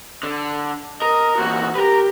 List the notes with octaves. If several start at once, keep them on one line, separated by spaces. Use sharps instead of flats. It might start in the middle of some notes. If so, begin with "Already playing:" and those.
D3
A#4 D#5
E2 A#2 F#4
G4 A#4 B4